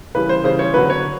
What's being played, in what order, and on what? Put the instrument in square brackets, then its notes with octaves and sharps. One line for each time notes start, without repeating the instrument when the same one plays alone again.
[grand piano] C#3 E3 G3 B4
C5
C#3 E3 G3 C5
C#5
D3 F#3 B3 B4
C#5